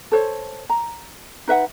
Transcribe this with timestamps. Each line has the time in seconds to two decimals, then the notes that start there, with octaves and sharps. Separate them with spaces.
0.12 A4 C5 C#5
0.70 A#5
1.48 D#4 B4 E5 F#5